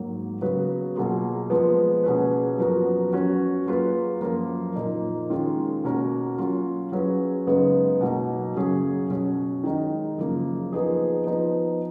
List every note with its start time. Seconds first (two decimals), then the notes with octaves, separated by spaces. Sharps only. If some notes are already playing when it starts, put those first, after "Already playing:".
Already playing: G#2 F#3 A#3
0.41 C#3 F#3 B3 F#4 B4
0.96 B2 F#3 A#3 F4 G#4
1.50 F3 G#3 B3
2.04 B2 A#3 C#4 G#4 B4
2.58 F#2 F3 B3 F#4 A#4
3.13 F#3 C#4 F#4 B4
3.67 F#3 A#3 F4 G#4 B4
4.21 F#2 F3 A#3 F4 A#4
4.76 A#2 F3 A#3 D#4
5.30 D#3 G#3 C#4 F4
5.84 B2 A#3 C#4 F#4 A#4
6.38 F#3 C#4 F4
6.92 F#3 C#4 G#4 B4
7.47 F#2 C#3 G#3 B3 D#4
8.01 B2 F#3 A#3 D#4
8.55 F#2 C#3 F#3 C#4 G#4
9.10 B2 F#3 C#4 F#4
9.64 D#3 G#3 D#4
10.18 F#2 C#3 F3 A#3
10.72 F3 B3 D#4 G#4
11.27 F3 B3 D#4